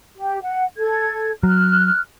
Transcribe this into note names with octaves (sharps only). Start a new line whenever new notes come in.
G4
F#5
A4 G#6
F#3 F6 F#6